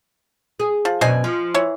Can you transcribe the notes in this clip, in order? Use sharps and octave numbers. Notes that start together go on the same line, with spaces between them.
G#4
F3
F#2 B2 D4 C5 D#5 G#5
F3
E3 C#5